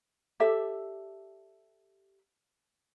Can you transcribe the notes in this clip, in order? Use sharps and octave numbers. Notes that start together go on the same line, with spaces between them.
G4 A4 D5 E5